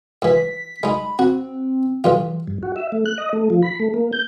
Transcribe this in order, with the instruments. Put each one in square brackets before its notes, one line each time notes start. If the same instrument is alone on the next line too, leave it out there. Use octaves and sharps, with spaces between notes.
[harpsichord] G#2 E3 [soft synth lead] B6
[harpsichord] G#3 D#4 [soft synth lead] B5
[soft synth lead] C4 [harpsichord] F#4
[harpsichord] B1 G2 F4 [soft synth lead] E3
[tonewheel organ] G2
F#4
E5
A3
F#6
D#5
A3
F3
B5
A3
A#3
G6